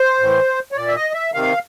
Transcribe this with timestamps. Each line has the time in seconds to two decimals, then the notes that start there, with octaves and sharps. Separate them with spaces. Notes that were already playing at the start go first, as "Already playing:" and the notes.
Already playing: C5
0.20 A2 E3
0.72 C#5
0.76 A#2 D5
0.87 E5
0.96 D#5
1.14 E5
1.34 C3 D#3 F5